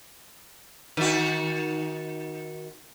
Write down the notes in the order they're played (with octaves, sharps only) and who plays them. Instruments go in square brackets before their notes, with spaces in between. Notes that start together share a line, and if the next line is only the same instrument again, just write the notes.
[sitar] D#3 F#4